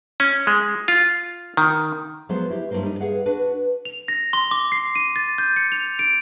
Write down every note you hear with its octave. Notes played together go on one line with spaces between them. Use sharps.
C#4
G#3
F4
D#3
F3 F#3 G#3 B3 C5
E4 G4
G2 D3 F#3 A#3 C5
G3 D#4
G#4 B4 F5 F#5
D4 F#4 B4 F#5
F7
A#6
C6
D6
C7
D#7
A6
G6
C#7
F7
D7